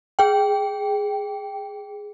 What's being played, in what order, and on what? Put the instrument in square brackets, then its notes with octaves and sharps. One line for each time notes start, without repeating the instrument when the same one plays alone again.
[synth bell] G#4 G5